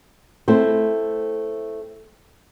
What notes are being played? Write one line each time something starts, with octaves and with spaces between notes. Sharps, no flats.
A3 C4 E4 C5